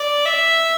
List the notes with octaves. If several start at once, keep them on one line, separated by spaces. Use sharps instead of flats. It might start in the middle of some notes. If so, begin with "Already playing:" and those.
Already playing: D5
E5